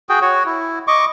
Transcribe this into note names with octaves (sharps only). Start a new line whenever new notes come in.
F#4 G#4 G5
F#4 C#5
E4
D#5 C#6 D6